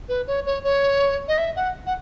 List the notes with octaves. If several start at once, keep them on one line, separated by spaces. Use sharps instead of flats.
B4
C#5
C#5
C#5
D#5
E5
F#5
F#5